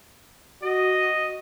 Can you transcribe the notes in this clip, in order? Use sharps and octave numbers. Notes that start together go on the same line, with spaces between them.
F#4 D#5